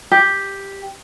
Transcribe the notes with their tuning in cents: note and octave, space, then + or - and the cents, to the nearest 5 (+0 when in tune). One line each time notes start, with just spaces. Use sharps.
G4 +5